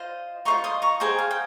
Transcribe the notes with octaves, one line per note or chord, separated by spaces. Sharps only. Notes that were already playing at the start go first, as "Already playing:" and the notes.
Already playing: F4 C5 D#5
F4 C5 D#5 A#5 C#6
C6 D#6
A#5 C#6
G#4 C5 D#5 G5 A#5
F5
G5